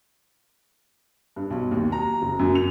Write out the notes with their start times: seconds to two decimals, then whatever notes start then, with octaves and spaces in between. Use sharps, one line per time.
1.36 G2
1.50 B1
1.71 D#2
1.92 A#5
2.22 F#1
2.39 F#2
2.55 F7